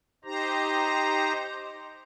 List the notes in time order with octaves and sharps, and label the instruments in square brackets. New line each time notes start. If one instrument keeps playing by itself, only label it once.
[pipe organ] D#4 G4 C5 A#5